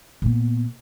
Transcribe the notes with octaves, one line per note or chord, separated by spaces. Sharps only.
A#2 B3